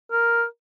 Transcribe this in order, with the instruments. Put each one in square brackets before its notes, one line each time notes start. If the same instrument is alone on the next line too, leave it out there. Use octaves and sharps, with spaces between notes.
[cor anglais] A#4